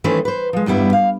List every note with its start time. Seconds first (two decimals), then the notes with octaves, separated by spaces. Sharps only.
0.04 D#3 E3 A3 C#4 B4 C5
0.25 B4 C5
0.53 F3 G#3
0.66 E2 G2 G3 B3 E4
0.93 F5